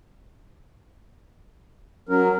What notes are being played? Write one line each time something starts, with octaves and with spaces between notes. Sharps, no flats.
F#3 C#4 A#4